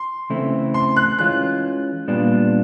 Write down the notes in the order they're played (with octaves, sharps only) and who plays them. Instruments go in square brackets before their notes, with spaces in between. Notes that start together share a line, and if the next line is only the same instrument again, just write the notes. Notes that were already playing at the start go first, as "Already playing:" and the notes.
Already playing: [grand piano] C6
[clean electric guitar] C#3 E3 A3 C4 E4
[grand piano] C6
F#6
[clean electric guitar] E3 G#3 C#4 F4 [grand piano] F#6
[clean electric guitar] A#2 G3 B3 D4 F4